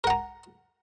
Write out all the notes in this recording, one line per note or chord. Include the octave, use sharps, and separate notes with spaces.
A#4 F#5 A#5